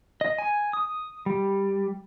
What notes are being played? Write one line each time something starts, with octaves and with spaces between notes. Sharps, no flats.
D#5
G#5
D#6
G3